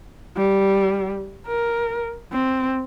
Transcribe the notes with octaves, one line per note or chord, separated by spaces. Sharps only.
G3
A#4
C4